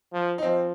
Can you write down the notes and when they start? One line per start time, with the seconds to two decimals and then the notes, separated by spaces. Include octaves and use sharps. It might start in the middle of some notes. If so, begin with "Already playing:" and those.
0.13 F3
0.38 D#4
0.43 F3 C4